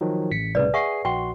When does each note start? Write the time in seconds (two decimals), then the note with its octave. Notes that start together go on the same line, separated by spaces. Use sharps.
0.01 D#3 F3 F#3
0.31 A1 B6 C#7
0.55 C2 A2 C#3 B4 D5
0.74 G#4 E5 F#5 C#6 C7
1.05 A#1 F#4 G5 C6